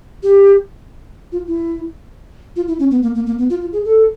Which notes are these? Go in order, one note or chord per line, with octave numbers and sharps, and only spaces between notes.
G4
F4
E4
F4
E4
C#4
B3
A#3
A#3
A#3
B3
F4
F4
G#4
A4